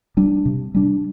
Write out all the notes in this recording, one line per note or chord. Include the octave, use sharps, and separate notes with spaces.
G3 D4
C3
G3 D4